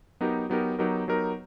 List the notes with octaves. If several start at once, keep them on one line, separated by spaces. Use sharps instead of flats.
F#3 B3 D#4 G4 A#4
F#3 B3 D#4 G4 A#4
F#3 B3 D#4 G4 A#4
F#3 B3 D#4 G4 A#4